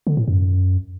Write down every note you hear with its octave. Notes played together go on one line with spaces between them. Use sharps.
D3
A2
F#2